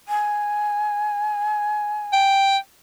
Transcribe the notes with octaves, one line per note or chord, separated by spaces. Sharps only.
G#5
G5